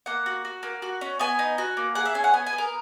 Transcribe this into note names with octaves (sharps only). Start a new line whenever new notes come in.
A#3 F#5
F#4
F#4
A#3
F#4
C#4
B3 G#5
D#4
F#4
A#3
G#4 F#5
E5
C#4 G#5
F#5
B3 G#5
G#5
B3
A#4